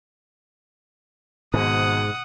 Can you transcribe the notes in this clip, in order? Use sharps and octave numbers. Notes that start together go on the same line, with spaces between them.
G#1 G#2 B2 F#5 D#6